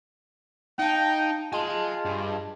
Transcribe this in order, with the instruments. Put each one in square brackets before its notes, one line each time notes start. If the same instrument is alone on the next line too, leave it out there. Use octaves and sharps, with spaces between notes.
[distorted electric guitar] D#4 [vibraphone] F5 A5 [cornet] G5
[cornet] F4 [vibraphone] G#4 D#5 A5 [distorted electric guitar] G#5 C6
[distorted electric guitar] G2